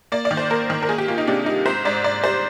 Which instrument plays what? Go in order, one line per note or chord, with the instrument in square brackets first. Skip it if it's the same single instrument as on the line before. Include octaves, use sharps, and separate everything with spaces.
[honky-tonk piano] A#3 D5
D5
D#3
C5
A#3 A#4
D#3
A#4
A#3 G#4
G4
A#3 F4
D#4
C3 D4
G3 D#4
G#2 C5
G#2 D5
G#2 D5
G3 C5